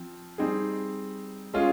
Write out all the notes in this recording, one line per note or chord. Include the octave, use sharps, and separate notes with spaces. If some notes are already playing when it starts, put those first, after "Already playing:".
Already playing: F3 C4
G3 C4 D#4 G#4
G#3 C#4 F4 G#4